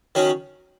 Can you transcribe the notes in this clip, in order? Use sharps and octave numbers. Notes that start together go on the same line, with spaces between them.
D#3 F#3 C#4